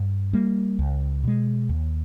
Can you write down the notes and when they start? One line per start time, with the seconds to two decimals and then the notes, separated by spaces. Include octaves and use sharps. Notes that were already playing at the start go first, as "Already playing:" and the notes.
Already playing: G2
0.33 G3 A#3
0.79 C#2
1.24 B2 G#3
1.69 D#2